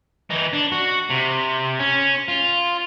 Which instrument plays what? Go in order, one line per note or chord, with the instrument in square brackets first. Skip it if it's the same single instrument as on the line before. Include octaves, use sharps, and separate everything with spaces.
[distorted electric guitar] E3 D#4
D4
F#4
C3
C#4
F4